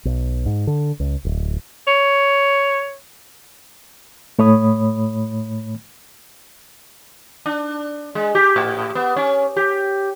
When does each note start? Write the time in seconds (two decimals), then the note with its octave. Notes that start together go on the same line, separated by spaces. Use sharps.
0.05 B1
0.46 G#2
0.67 D3
1.00 C#2
1.25 D1
1.87 C#5
4.39 A2 A3 C#5 B5 D#6
7.46 D4
8.15 G#3
8.35 G4
8.56 A2
8.95 B3
9.16 C#4
9.56 G4